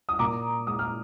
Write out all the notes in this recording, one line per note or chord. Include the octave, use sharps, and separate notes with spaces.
D#6
A#2 A#5 D6
G#3 D#6
F6